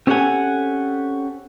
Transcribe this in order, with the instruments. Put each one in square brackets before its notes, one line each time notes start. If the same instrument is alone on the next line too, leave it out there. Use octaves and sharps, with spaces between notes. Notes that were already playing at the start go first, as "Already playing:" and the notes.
[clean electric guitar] C4 C#4 G4 A4 F#5 G#5